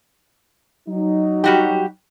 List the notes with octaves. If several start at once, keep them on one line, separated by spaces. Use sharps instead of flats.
F#3 D#4
G3 F#4 G4